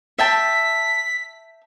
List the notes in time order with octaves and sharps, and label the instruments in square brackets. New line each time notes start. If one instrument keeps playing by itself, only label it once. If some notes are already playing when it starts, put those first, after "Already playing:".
[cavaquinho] E5 G5 A5 [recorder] B6